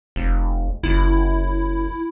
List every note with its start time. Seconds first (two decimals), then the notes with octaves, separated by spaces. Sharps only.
0.16 F1
0.83 F#1 E4